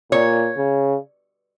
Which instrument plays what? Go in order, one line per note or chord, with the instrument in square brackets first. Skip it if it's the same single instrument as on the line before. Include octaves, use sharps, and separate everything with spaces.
[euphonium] A#2 [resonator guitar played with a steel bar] C#5
[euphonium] C#3